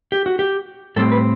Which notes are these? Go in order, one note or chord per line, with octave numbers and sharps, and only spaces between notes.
G4
F#4
G4
A2 G3 C4 A4
B4